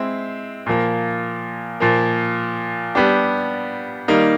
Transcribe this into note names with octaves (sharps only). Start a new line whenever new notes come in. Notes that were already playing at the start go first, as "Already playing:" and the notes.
Already playing: G#3 C4 E4
A#2 F3 A#3
A#2 F3 A#3
G3 B3 D4 G4
D#3 G3 A#3 D#4